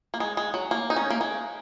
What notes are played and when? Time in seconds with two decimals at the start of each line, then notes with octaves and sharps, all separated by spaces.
0.14 A#3
0.20 G#3
0.37 G#3
0.54 F#3
0.71 A#3
0.90 D#4
0.96 C#4
1.10 A#3
1.21 G#3